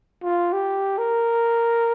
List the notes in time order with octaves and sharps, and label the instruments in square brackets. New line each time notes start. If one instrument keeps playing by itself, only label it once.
[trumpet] F4
G4
A#4